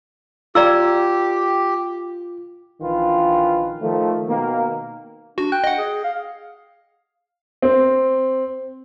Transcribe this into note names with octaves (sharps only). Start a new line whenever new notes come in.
F4 G4 D5 A#5 E6
A#1 D#3 E3 F4 B4
D#3 F3 A3
B2 D#3 A#3
D4 F#4
G5 F#6
D#5 F#5
G#4
F5
C4